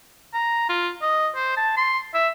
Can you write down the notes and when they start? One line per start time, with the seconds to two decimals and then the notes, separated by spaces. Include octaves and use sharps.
0.33 A#5
0.69 F4
1.02 D#5
1.35 C5
1.57 A5
1.77 C6
2.14 E5